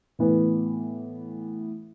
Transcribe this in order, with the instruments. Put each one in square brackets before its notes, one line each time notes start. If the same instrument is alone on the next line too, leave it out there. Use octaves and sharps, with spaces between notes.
[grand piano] A2 E3 B3